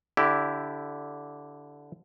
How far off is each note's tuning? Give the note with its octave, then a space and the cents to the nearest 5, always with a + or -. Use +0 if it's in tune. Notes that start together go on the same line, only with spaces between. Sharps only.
D3 -15 E4 +0 G4 -10